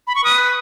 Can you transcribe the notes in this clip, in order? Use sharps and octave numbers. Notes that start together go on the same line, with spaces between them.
B5
C#6
B4 D#6